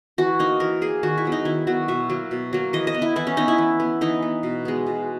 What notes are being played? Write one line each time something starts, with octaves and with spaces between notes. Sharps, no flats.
E3 F#4
A#3 D#4
E3 A#4
A#3 G#4
D#3 F#4
E4
F#3 B3
D#4
D#3 E4
F#3 B3 F#4
B2 E5
F#3 A#3
B2
F#3 A#3
E3 D#5
D#5
B3
E4
E3 E4
C#4
B3 D#4
E4
E3
B3
E3 D#4
B3
B2
G#3 B3
B2